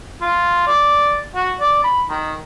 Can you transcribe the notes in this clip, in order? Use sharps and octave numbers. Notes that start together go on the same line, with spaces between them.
F4
D5
F#4
D5
B5
D#3